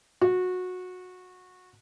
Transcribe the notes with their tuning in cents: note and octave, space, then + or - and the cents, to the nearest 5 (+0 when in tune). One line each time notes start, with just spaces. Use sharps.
F#4 -20